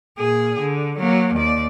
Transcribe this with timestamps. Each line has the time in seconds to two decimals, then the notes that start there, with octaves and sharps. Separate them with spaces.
0.18 A#2 G#4
0.60 D3
0.99 F#3 A#3
1.35 D#2 D5